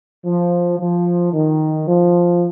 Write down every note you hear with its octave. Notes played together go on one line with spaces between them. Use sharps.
F3
F3
D#3
F3